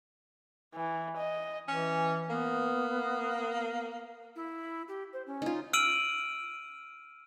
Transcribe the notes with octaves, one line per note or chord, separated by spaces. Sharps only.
E3
D#5
E3 C#4
A#3 B3
E4
G4
C5
C#4
D#4 F4
E6 F6 D7 D#7 F#7